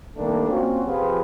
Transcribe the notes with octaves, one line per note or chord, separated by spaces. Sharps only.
C3 D#3 G3 A3 A#3 D4
A#3 C4 C#4 F4 F#4
C3 F3 F4 G4 G#4 B4